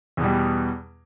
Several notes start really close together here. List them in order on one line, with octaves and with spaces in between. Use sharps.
E2 B2 G3